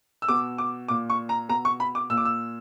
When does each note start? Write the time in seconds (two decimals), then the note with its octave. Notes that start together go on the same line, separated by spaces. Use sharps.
0.22 E6
0.28 B2 D6
0.58 D6
0.88 A#2 D6
1.10 C#6
1.29 A#5
1.49 B2 A#5
1.65 C#6
1.80 B5
1.95 D6
2.10 A#2 E6
2.17 D6
2.25 E6